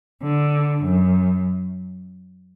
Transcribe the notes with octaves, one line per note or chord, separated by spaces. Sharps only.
D3
F#2